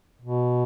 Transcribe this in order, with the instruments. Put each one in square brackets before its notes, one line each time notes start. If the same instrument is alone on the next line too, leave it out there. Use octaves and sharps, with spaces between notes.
[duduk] B2